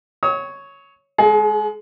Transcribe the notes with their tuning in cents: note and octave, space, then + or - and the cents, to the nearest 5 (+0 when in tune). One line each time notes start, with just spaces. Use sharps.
C#5 +0 D#6 +45
G#3 +0 G#4 +40